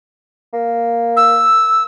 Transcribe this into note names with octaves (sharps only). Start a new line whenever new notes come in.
A#3
E6